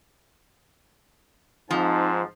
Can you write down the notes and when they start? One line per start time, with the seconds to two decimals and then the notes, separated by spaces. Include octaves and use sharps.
1.71 G#2 F3 C4 D#4 A5